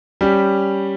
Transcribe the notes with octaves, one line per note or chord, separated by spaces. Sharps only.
G3 C#4 G4